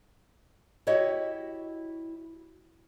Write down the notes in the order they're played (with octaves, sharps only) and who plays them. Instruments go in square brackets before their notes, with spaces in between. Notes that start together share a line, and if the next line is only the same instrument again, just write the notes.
[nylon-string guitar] E4 F#4 G4 C#5 D#5